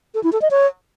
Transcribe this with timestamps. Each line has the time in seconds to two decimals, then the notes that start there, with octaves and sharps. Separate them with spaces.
0.14 A4
0.24 E4
0.33 A4
0.42 D#5
0.51 C#5